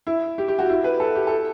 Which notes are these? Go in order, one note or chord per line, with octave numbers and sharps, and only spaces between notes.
E4
G4
G4
F#4
E4
B4
A4
G4
A4